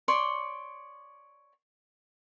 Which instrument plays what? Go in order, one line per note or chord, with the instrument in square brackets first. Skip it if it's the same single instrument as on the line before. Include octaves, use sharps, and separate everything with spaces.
[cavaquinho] C#5 D5 C6 D6